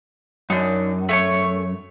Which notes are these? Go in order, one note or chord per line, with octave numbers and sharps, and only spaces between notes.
F#2 D4 D#4
A3 C#5 C#6